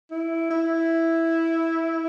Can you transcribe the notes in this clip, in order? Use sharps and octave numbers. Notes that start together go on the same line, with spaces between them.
E4
E4